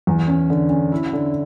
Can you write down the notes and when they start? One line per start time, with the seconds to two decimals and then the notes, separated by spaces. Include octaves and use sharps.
0.07 E2
0.28 C#4
0.50 D3
0.70 C#4
0.92 E4
1.13 D3